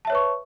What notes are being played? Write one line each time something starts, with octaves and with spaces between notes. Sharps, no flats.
B4 C#5 E5 A5 C#6